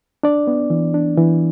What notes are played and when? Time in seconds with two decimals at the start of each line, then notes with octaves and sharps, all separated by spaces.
0.23 D4 D5
0.47 B3
0.70 E3
0.94 D4
1.18 E3